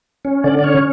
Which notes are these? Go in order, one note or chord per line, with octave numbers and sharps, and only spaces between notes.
C#4
D3 D5
D5
C#4 C#5